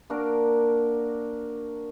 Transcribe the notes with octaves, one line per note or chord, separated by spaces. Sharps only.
A#3 D4 F#4 A#4